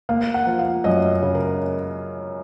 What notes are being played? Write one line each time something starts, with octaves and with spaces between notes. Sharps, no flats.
A#3 F5
F#5
F3
F5
F#2 D#5
C#3
A#4